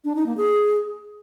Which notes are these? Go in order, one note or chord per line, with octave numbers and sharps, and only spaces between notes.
D4
D#4
A#3
G#4